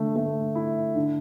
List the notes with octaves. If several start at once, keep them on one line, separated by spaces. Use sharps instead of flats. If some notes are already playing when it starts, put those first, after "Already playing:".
Already playing: D3 A3
A3
E4
D3